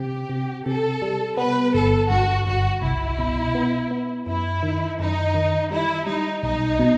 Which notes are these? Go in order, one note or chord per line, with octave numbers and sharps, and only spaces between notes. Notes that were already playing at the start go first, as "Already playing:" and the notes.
Already playing: C3 G4
C3
C3 A4
G3
B3 B4
G1 A4
G2 F#4
G1 F#4
C2 E4
B2
B3
B3
F#2 E4
D#3
F#2 D#4
D#3
G3 E4
G3 D#4
B1 D#4
B2